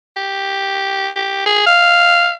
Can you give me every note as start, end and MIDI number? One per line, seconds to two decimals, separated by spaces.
0.16 1.09 67
1.16 1.42 67
1.46 1.62 68
1.66 2.33 77